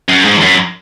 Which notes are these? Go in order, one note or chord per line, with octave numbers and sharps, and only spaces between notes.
F#2
G#2
E2
F#2